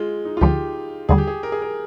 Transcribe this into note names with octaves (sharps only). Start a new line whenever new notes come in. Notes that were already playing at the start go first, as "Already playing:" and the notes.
Already playing: G#3 F4
D#4
F4
D2 D3 F3 G4
D#2 D3 G3 G#4
G4
G#4
A#4
G#4
A#4